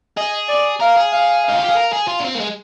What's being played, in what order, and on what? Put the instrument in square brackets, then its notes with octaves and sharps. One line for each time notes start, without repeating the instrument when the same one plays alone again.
[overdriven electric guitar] G#4 [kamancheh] D#5
[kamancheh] D5
[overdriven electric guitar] A#4 [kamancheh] F5
[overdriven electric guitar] G#4
[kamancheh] F5
[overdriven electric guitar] D#4 [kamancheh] F5
[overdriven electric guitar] F4
G4
G#4
A#4
G#4
F4
D4
C4
A#3
G#3